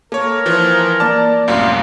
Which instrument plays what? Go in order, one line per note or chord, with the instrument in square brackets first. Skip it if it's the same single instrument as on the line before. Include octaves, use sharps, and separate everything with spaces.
[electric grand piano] A#3 C#5 [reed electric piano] A4 [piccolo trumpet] A#4
[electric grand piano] E3 F3
[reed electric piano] A#3 D6 [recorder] D5 [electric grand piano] A5 F6
[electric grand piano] C2 F#2 A2 [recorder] F5